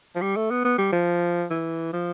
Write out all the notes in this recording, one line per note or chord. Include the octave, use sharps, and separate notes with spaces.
F3
G3
A3
B3
B3
G3
F3
E3
F3